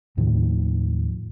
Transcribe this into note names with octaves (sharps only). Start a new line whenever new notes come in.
D#2 A2 D#3 F3